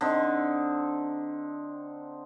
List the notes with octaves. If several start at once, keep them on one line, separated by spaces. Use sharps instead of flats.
D3 C4 D#4